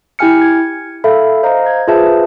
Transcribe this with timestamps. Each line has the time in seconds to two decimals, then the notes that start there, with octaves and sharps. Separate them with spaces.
0.19 E4 G4 G5 G#5 F6 C#7
0.42 G#6
1.04 A4 E5 F5 B5
1.43 C5 D#5 F5 A#5
1.66 G#6
1.88 F4 G#4 B4 C5 E5 A5